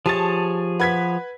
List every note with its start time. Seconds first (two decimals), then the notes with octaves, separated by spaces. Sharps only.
0.06 F3 G4 G#4 C#5 A5 A6
0.80 B4 F#5 G#6 B6